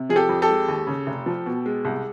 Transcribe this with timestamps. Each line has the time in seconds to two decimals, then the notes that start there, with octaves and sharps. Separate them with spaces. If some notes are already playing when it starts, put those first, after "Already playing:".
Already playing: C3
0.09 F3 G#4
0.16 G4 A4
0.29 F2
0.42 G4 A4
0.49 G#3
0.68 D#2
0.87 C#3
1.07 F1
1.26 F3
1.46 B2
1.66 G#3
1.85 C2